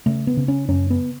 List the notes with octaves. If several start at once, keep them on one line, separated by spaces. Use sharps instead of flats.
C#3 A3
B3
C#3
C#4
F#2 C#4
B3